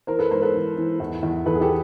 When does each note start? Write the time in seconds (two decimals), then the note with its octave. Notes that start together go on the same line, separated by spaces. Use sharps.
0.07 E3 A#4 C5
0.19 A4 B4
0.30 G#2 A#4 C5
0.42 A4 B4
0.55 E3
0.77 E3
1.00 E2
1.23 E2
1.46 E2 A4 B4
1.55 G#4
1.61 G4 A4